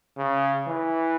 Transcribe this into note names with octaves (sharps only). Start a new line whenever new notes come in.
C#3
E3